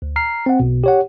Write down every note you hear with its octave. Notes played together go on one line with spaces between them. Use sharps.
D2
A#5 F6 C7
C4 F#5
B1 B2
G4 C#5 F#5